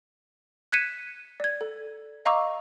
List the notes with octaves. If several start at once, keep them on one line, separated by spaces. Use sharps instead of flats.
F#6 G#6 B6 C#7 D#7 E7
D5 G#6
A4
D#5 F5 A#5 C#6 D6 E6